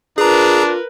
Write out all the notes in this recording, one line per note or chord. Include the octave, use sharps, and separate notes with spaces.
D4 F4 G#4 A#4 B4 A#5